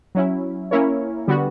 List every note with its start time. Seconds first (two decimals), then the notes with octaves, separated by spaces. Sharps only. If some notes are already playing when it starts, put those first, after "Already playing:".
0.15 F#3 C#4 E4
0.71 A#3 C#4 E4 A#4 C#5
1.28 D3 G3 B3 F#4